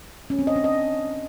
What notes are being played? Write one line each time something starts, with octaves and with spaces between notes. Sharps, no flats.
C#4
C4
D#5
D4
D#5